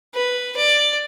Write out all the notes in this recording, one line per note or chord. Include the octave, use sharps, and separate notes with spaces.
B4
D5